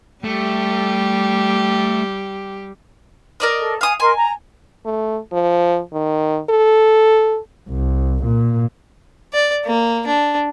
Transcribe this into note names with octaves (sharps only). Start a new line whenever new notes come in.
G3 A3 G4
A#4 D5 D#5
A4
F5 G#5 D#6
A#4 D#5 G#5 C6
A#5
A3
F3
D#3
A4
C2
A#2
D5
A#3
D4